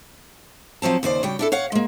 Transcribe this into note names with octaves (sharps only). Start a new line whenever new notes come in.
F3 F#3 C4 A5
D#2 C#3 C5 D5
C#3 G3 F#4 G5
D4 E4 A4
C#5 F5 F#5
G#3 A#3